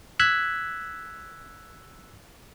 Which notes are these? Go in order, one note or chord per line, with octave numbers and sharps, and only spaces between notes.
E6 F#6 G#6 B6